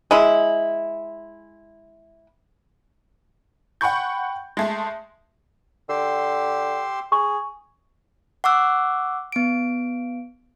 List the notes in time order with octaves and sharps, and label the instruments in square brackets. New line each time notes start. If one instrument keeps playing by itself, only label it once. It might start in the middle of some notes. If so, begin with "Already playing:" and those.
[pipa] G#3 E4
[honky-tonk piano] F#5 G5 B5 C#6 G6
G#3 A3 C6
[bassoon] D3 [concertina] G4 C6 E6
[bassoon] G#4 [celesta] C#6
[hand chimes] F#5 C#6 D6 E6 F#6
B3 D7